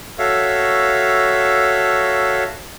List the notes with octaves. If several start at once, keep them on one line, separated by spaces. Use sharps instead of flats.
F#4 A4 C#5 E5 F5